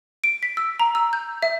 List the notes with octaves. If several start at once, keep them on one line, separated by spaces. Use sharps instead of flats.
D7
B6
E6
A#5
E6
G6
E5